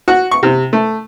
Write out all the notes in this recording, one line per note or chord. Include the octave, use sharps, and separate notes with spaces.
F#4
C#6
C3
A3